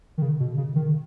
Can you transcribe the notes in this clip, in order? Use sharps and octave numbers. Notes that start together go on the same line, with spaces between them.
D#3
C#3
B2
C#3
D#3